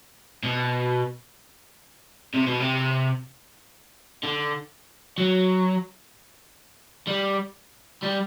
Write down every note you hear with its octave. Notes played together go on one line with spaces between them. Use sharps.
B2
C3
B2
C3
D3
F#3
G3
G3